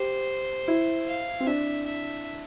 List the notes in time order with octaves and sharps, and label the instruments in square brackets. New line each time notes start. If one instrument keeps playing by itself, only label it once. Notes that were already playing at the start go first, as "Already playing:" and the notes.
Already playing: [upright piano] G4 [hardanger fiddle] C5
[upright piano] E4
[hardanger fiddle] F5
[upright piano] C4
[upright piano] D4 [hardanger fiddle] E5
[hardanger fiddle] E5